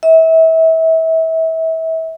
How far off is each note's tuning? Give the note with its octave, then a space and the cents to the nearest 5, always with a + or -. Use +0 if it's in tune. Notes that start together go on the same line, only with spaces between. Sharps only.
E5 -30